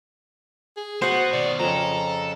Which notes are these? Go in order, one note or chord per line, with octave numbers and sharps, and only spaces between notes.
G#4
B3 F#4 C5 F#5 D#6
B2 D#3 D5
F2 C#3 A4 A#5